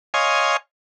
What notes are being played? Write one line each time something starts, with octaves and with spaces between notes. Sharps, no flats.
C#5 D#5 F5 G#5 C6